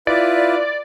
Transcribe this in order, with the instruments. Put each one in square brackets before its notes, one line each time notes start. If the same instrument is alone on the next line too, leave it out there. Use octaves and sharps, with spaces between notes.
[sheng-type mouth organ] E4 F4 B4 [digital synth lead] D5